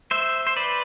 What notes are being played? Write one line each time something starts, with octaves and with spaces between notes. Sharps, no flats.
C5 E5
C5
B4 D5